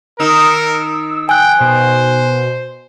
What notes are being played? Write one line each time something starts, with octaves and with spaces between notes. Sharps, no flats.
D#3 D#4 A#4 E6
G5 G#5 F#6
B2 C5